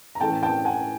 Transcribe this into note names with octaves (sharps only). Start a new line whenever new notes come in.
A#5
A2 E3 A3 C#4 G5 A5
G5 A5
F#5 G#5